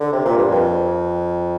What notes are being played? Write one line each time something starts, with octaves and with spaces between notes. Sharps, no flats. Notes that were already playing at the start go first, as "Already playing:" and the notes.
D3
C3
A#2
G2
F2